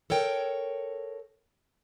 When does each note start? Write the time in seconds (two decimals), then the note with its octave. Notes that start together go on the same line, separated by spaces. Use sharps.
0.10 A4 A#4 C#5 G5